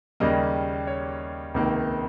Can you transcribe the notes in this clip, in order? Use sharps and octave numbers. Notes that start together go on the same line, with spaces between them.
D#2 C#3 G3 A#3 D#5
C#5
C#2 C3 D#3 A#3